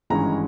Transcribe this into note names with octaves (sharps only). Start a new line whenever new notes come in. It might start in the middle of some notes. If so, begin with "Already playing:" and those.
G#1 G2 E3 G#3 C#4 A#5